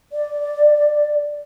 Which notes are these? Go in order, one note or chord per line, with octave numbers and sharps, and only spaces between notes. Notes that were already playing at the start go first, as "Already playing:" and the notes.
D5